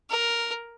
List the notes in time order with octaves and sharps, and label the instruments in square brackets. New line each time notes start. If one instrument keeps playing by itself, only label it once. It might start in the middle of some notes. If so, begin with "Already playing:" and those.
[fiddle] A#4